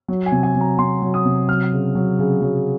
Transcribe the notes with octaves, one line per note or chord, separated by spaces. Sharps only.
F#3
G#5
C3
G#5
F#3
A#5
C3 C6
F#3
D#6
C3
F#3 F6
C#3
F#3
C#3
F#3